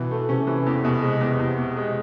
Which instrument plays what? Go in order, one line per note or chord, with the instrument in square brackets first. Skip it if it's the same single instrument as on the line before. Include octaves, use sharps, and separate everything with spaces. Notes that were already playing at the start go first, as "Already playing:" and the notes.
Already playing: [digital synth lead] B2 [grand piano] E3
[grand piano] A3
[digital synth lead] C3 [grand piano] C#4
[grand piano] E3
E2
B2
G#3
E2
E2
B2
G#3